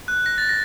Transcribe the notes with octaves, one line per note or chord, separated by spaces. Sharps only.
F#6
A#6
A6
A#6